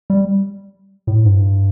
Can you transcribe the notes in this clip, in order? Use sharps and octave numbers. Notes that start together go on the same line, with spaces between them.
G3
A2
G2